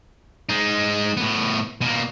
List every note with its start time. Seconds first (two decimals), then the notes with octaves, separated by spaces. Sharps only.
0.50 G#3 D#4
1.17 A2 B3
1.81 B2 A#3